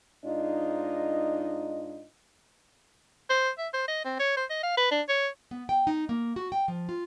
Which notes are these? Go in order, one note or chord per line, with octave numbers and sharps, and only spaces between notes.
G#2 D4 D#4 F4 D#5
C5
E5
C5
D#5
C4
C#5
C5
D#5
F5
B4
D4
C#5
B3
G5
D#4
A#3
F#4
G5
F3
F4